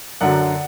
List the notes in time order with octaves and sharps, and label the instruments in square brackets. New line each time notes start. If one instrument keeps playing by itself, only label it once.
[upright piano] F#2 D3 F#3 D5 F#5